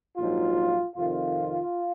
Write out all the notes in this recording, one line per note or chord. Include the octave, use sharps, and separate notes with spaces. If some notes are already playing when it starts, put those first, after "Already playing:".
A#1 G#2 F#3 F4
F2 C3 D#3 F4